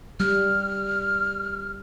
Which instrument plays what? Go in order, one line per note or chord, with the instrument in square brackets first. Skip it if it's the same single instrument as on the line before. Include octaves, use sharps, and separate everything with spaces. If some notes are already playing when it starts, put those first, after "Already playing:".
[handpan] G3 [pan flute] F6